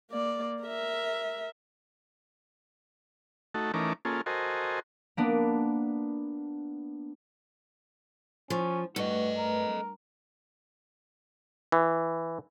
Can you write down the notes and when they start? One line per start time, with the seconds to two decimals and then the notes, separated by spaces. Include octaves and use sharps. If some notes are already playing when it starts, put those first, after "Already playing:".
0.11 A#3 D5
0.63 A#4 E5
3.54 A3 D#4 F#4 A4
3.74 E3 A3 C#4 D#4 A#4 D6
4.05 A#3 C#4 F4 G#4 A4
4.26 F#4 A4 A#4 C5 D#5 G#5
5.17 A#3 B3 D4
8.50 F3 C#4
8.96 G2 A3 F#4 A4 B4 D#5
9.37 A#4
11.72 E3